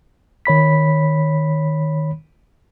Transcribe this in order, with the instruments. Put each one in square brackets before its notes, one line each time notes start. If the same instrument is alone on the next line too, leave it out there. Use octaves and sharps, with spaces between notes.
[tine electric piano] D#3 C#5 B5 B6